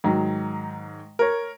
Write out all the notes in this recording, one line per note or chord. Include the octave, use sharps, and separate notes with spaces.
G#2 D#3 F#3
A#4 C#5